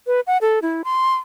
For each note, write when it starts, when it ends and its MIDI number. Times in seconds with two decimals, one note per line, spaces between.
0.07 0.20 71
0.27 0.38 78
0.42 0.59 69
0.62 0.82 64
0.84 1.15 84